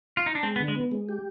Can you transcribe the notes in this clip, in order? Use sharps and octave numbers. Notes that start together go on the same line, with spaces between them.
F4
D#4
D4
G#3 C4
B3
D3
G#3
B3
G#3
G4